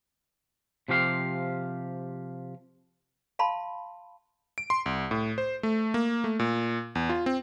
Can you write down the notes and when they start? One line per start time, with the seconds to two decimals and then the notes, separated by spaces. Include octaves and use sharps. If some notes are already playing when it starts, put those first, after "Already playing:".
0.88 C3 F3 G4 F5
3.39 F5 A5 B5 C6
4.58 D7
4.70 C6
4.86 C2
5.11 A2
5.38 C5
5.63 A3
5.94 A#3
6.24 A3
6.39 A#2
6.95 E2
7.10 F4
7.26 C4